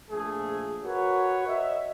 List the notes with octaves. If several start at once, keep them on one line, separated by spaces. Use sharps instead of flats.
A#1 F3 A3 G#4
F#4 A#4 B4 C#5
D#5 E5